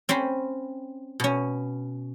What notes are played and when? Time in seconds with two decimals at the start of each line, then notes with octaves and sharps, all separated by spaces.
0.09 C4 C#4 C5 B5
1.20 B2 C#4